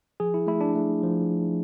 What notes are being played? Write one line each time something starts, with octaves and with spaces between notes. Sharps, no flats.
F3 G#4
E4
A3 E4
D4
A3
F3